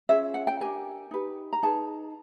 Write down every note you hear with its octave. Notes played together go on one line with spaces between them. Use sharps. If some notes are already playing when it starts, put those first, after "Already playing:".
C#4 F4 G#4 E5
F#5
G5
D4 G4 A#4 G#5
D#4 G4 B4
A#5
D#4 G#4 B4 A5